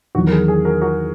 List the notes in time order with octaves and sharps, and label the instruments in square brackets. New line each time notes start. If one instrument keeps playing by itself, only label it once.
[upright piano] E2 D#3 F#3 [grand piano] F#4
[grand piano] A#4
G#4
G#4
F#4 A#4
F#4 A#4